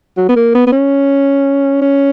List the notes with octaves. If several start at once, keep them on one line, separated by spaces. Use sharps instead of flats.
F#3
B3
A#3
B3
B3
C#4
C#4